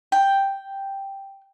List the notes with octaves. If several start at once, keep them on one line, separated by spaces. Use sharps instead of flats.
G5